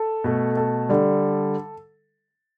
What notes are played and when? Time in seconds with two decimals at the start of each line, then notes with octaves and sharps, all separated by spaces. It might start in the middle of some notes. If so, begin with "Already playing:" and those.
Already playing: A4
0.24 B2 A3
0.57 A4
0.89 D3 G3